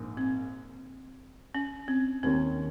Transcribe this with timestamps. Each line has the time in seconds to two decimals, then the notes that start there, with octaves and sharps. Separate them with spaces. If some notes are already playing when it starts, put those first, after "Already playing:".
Already playing: A#1 G#2 A#3
0.17 C4
1.55 C#4
1.88 C4
2.23 D#2 D#3 A#3 C4 C#4